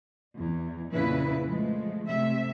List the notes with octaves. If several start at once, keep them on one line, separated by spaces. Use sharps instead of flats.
E2
F2 A#2 C#3 E4 B4
F3 G#3 A3
C3 A3 E5